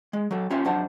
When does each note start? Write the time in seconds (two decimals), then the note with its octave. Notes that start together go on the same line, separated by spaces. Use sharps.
0.13 G#3
0.31 F#3 A4
0.50 C#4 F4 G4 C#5 E5
0.65 F2 F#3 D4 C5 F#5 A5